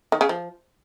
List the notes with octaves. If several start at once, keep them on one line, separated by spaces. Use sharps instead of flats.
D#3
C#3
F3